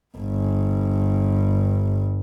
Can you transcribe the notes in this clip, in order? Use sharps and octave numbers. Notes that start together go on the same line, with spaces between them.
G1 G2